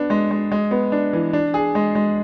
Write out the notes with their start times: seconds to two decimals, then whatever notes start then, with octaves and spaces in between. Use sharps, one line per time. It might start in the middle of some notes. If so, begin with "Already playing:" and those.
Already playing: B3 D4
0.10 G#3
0.31 G#3
0.52 G#3
0.71 B3
0.92 D4
1.13 E3
1.33 D4
1.54 G#4
1.75 G#3
1.95 G#3